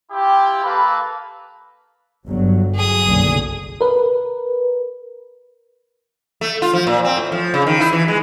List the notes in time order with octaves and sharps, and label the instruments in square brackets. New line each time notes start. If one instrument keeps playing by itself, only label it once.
[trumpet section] E4 F4 G4
A#3 A4 B4 F5 B5
[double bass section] G1 F#3
[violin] G#4 D#6
[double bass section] F#1 B1 D3
[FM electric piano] A#4 B4
[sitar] A3
F4
F3
A#2
C4
A2
F3
C#3
D#3
E4
E3
G#3